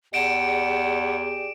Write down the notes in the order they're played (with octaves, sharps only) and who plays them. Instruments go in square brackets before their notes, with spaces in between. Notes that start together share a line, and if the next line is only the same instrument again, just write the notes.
[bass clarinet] E2 [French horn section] G4 G#4 D5 [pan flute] F#5 [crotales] D7 E7